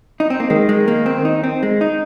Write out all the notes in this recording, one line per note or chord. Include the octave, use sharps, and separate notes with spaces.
D#4
C4
A#3
D#3 G#3
G#3
A#3
C4
D#4
C4
G#3
D#4